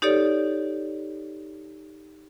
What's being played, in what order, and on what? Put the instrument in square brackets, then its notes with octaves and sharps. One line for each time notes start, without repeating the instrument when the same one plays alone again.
[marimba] D#4 G4 A4 C#5 D5